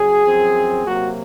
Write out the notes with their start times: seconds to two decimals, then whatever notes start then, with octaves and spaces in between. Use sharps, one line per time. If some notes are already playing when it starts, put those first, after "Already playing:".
Already playing: C#3 F#3 G#4
0.26 F#2 F3 C4
0.85 C3 F#3 A#3 F#4